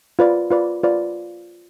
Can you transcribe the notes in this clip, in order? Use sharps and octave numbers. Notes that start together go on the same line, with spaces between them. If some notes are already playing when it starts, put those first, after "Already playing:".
F4 B4 D5
F4 B4 D5
F4 B4 D5